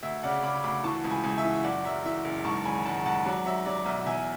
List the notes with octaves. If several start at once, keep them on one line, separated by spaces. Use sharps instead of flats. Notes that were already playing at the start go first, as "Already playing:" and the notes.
D2 E5
C#3 D5 F#5
C#3 B5 D6
D2 B5 D6
E3 A5 C#6
C#2
G#5 B5
C#2
E5 G#5
E3
F#1 D5 F#5
F#2 E5
E3 E5
F#1
G#2 A5 C#6
G#1 G#5 B5
G#1 F#5 A5
G#2 F#5 A5
F#3 D5 F#5
F#3 E5
F#3 D5
B1 E5
E2 E5 G#5